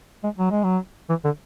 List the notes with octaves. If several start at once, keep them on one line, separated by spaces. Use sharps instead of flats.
G#3
F#3
G#3
F#3
E3
D3